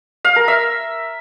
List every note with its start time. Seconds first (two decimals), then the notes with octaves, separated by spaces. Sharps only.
0.25 F5
0.36 A#4
0.48 E5